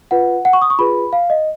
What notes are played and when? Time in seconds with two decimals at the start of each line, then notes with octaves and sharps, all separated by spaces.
0.11 F4 B4 F#5
0.45 F#5
0.53 C#6
0.62 D#6
0.70 C#6
0.79 F4 G#4 B4 B5
1.13 F5
1.30 D#5